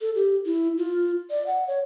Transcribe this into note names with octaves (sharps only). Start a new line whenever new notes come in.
A4
G4
E4
F4
D5
F#5
C#5